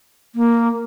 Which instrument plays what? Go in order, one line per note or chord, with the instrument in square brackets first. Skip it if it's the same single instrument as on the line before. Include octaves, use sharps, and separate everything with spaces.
[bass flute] A#3